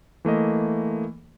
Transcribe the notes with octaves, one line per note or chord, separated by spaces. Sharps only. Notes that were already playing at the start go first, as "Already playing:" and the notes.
E3 A3 A#3 D#5